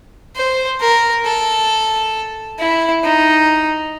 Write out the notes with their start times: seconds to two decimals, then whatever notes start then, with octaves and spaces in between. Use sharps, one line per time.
0.35 C5
0.80 A#4
1.25 A4
2.59 E4
3.03 D#4